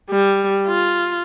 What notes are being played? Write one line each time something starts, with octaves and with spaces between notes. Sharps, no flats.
G3
F4